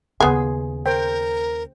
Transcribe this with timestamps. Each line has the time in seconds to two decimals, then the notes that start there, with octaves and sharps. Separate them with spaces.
0.20 D#2 C#3 B3 G#4 G#5 C6
0.86 A#4 C5 G5